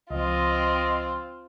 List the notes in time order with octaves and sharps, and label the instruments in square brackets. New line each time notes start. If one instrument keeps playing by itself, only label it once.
[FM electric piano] C#2 F3 [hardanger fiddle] C4 F4 [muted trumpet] D#5